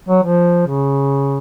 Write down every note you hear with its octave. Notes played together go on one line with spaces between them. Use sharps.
F#3
F3
C#3